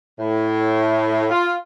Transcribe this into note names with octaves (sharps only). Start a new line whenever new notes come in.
A2
F4